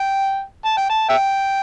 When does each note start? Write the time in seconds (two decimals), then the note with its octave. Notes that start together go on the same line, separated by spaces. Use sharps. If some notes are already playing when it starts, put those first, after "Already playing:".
Already playing: G5
0.65 A5
0.77 G5
0.90 A5
1.09 E5 G5